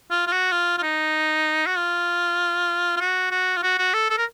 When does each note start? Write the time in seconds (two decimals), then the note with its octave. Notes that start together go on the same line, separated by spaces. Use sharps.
0.11 F4
0.27 F4
0.32 F#4
0.52 F4
0.78 F4
0.83 D#4
1.66 F#4
1.77 F4
2.97 F4
3.00 F#4
3.31 F#4
3.57 F4
3.63 F#4
3.78 F#4
3.94 A4
4.10 A4
4.18 A#4